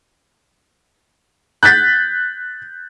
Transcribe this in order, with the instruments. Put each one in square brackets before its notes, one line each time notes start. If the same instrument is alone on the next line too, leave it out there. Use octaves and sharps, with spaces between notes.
[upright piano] F#6 G6 A6 B6